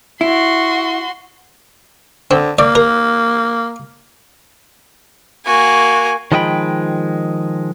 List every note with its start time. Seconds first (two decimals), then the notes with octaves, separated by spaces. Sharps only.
0.21 E4 F#4 C6
2.31 D3 C4
2.59 A#3 D5
2.75 A#4
5.46 A#3 F#4 G#5
6.32 D#3 F3 G#3 D#5 G5 B5